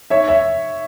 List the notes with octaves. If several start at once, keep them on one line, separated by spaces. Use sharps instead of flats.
C#5 E5
C#5 E5